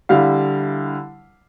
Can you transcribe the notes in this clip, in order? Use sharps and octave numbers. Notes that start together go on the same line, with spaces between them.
D3 G3 E4 F5